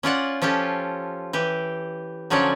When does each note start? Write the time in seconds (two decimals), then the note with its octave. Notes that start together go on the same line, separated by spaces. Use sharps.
0.03 C#4 F4 D5 F#5
0.42 F3 C#4 F4 G4 A4
1.33 E3 G4
2.30 D3 F3 F#3 C#4 C#5 D5